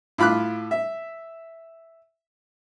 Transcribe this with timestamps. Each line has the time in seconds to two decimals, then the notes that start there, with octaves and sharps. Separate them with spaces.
0.18 A2 F4 B5 D6 F#6
0.71 E5